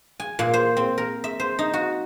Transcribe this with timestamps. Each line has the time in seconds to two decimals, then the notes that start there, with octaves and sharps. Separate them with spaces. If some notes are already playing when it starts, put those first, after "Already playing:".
0.20 G#5
0.39 A#2
0.54 C5
0.77 C4
0.98 A#4
1.24 E5
1.40 C5
1.59 D#4
1.74 F#4